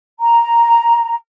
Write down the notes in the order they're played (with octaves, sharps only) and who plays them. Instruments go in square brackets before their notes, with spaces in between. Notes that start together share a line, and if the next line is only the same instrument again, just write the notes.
[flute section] A#5